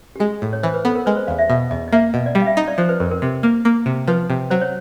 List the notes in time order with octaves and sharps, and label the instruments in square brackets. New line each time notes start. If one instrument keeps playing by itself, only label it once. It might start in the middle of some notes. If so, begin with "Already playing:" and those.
[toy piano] G4
[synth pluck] G#3 [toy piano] F#4
[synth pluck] A2
[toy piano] C#5
[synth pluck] E3 [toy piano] C5
[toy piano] B4
[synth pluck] B3 [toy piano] A4
[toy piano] A#4
[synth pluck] G#3 [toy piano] B4
[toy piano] C5
[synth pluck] E2 [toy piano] F5
[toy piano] E5
[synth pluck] B2 [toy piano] E5
[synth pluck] E2 [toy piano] D#5
[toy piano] D#5
[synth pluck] A#3 [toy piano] E5
[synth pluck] B2
[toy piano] D5
[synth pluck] G3 [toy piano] D#5
[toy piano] F5
E5
[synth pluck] D#4 [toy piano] D#5
[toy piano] D5
[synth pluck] F3 [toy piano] C5
[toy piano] B4
[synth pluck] F2 [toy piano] A#4
[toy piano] A#4
[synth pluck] C3
A#3
A#3
C3
[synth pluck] F3 [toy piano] B4
[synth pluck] C3
[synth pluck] F#3 [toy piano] C5
[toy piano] C#5